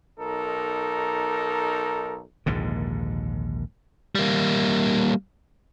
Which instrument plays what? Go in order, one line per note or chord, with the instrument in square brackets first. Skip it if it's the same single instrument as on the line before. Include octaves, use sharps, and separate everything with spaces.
[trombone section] B1 D#4 A4 A#4
[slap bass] A#1 D#2 G#2 D3
[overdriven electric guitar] G3 A#3